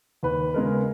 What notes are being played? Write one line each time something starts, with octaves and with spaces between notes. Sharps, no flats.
D#2 B4
C#3 G#3 B3 A#4